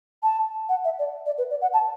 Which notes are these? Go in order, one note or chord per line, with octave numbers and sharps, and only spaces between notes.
A5
F#5
E5
D5
D5
B4
D5
F#5
A5